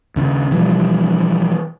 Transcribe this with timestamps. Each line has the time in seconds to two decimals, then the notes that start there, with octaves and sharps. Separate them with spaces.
0.16 D#2 C#3
0.51 B2 E3 F3 G3